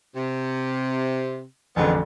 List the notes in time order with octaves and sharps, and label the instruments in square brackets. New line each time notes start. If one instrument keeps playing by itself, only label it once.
[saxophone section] C3
[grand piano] A1 F2 D3 [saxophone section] F3 G#3 B3